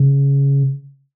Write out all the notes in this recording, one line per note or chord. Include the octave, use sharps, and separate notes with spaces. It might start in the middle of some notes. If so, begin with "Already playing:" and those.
Already playing: C#3